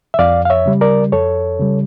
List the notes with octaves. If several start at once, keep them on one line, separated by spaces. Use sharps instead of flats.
E5
F2 D5 F5
F5
C#5 E5
C#3 G3
A#4 D5
F2 A4 C#5
C#3 G3